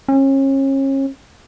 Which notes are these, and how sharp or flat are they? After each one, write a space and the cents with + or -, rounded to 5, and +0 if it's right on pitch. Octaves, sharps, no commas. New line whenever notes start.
C#4 -35